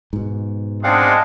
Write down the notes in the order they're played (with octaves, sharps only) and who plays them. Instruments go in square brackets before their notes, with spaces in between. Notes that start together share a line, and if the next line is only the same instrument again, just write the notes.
[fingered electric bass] G#2 B2
[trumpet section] G#3 D4 [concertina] C4 F5 F#5